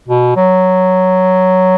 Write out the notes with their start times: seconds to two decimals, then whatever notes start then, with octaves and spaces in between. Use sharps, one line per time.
0.08 B2
0.37 F#3